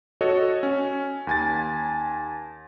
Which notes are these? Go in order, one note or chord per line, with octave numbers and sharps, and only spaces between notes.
F#4 A4 C#5 D#5
C#4
D#2 G#5 A6